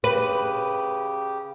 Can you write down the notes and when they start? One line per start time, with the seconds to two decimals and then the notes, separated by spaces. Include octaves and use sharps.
0.04 C#3 G4 B4